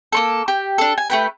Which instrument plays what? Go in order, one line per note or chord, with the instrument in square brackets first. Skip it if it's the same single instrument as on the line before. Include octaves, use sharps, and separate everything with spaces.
[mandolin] A#3 C4 A4
G4
D4 A4
G#5
A3 G4 B4